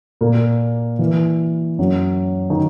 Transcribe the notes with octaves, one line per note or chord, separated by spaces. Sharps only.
A#2 A#3
E3
F#2 F#3
D#3